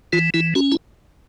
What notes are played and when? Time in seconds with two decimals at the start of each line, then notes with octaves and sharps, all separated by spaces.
0.13 E3 F4
0.34 E3 E4
0.55 C#4 F#4
0.72 E4